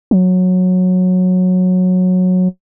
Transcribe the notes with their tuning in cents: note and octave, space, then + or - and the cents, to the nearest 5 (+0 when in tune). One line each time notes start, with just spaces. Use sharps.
F#3 -15